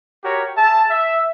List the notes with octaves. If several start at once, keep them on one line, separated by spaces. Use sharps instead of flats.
F#4 G4 A#4 C#5
G#4 E5 A5
E5